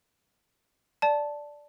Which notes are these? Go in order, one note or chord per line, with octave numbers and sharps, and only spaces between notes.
D5 A5